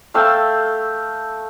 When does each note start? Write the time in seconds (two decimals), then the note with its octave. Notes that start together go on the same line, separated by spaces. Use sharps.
0.14 A3 F5 G5 E6